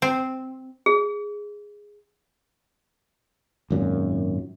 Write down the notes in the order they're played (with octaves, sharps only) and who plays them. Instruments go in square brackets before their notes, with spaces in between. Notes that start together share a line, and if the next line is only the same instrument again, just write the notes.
[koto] C4
[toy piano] G#4
[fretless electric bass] G#1 F#2 A#2